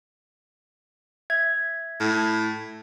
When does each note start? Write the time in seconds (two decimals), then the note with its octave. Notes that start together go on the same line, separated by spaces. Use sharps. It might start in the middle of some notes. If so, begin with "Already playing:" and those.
1.30 E5 G#6
2.00 A2